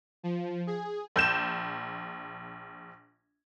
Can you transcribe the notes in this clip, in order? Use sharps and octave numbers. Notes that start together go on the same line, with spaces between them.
F3
G#4
A#1 G6 E7